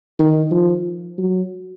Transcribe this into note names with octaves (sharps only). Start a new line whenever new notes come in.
D#3
F3
F#3